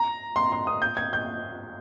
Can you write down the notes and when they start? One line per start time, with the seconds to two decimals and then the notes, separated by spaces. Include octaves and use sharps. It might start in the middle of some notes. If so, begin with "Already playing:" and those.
Already playing: A#5
0.36 C6
0.52 C6
0.67 D#6
0.82 G6
0.97 G#6
1.13 G6